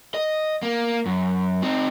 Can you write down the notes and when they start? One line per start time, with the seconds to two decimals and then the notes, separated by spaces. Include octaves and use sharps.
0.14 D#5
0.62 A#3
1.06 F#2
1.62 C4 D#4